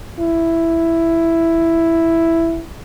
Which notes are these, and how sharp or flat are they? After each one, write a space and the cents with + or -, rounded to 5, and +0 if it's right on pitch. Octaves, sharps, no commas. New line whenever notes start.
E4 +5